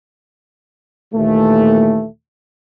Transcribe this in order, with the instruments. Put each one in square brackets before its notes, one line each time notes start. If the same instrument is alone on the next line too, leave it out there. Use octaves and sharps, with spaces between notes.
[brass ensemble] D#2 A#2 E3 A3